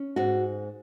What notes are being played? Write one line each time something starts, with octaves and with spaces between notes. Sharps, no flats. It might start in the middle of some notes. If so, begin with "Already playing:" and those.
Already playing: C#4
G#2 F#4